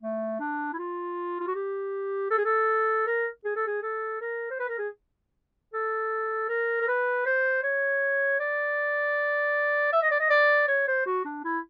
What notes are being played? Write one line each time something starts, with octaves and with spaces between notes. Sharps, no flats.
A3
D4
E4
F4
F4
F#4
G4
A4
G#4
A4
A#4
G#4
A4
G#4
A4
A#4
C5
B4
A#4
G#4
A4
A#4
A#4
B4
C5
C#5
D5
E5
D#5
D5
D#5
D5
C#5
C5
F#4
D4
E4